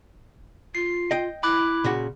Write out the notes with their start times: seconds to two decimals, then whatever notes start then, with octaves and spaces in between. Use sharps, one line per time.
0.75 F4 C7
1.11 D#5 G5
1.43 E4 B5 D6 F#6
1.84 A#2 C#3 F#4